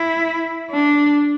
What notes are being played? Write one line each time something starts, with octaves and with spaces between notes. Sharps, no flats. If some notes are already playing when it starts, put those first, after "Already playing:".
Already playing: E4
D4